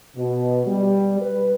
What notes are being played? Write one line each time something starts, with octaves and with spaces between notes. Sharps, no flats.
B2
G3
B4